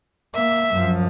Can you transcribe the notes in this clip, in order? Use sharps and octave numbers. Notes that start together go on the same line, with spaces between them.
A#3 E5
F#2 F3